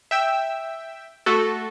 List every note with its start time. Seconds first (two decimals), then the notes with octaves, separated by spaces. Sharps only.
0.11 E5 G5 E6
1.26 A3 F#4 A4